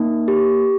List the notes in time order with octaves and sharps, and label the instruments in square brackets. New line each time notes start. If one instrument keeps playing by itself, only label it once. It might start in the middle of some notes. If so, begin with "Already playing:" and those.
Already playing: [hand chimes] A#3 D#4
G4